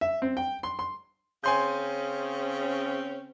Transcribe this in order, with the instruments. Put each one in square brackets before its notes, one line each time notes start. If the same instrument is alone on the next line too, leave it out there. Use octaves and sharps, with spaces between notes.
[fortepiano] E5
C4
G5
C6
C6
[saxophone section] C#3 C4 C#4 [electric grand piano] G#5 C6 G6